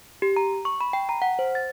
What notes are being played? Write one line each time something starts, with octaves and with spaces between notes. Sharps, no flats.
G4
A#5
C#6
B5
G5
A#5
F#5
C5
A6